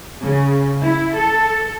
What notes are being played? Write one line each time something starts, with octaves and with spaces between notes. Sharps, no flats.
C#3
E4
A4